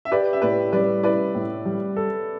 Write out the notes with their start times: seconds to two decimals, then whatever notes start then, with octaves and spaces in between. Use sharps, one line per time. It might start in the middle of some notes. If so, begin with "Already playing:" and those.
0.05 E5
0.11 G4 B4 D5
0.33 E5
0.42 A2 B4 D5
0.72 G3 B4 D5
1.03 E4 B4 D5
1.35 A2
1.66 G3
1.96 A4